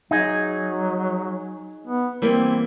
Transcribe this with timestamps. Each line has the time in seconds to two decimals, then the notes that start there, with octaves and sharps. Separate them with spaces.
0.11 F#3 D#4 G#4
1.87 B3
2.22 E3 G3 A#3 C4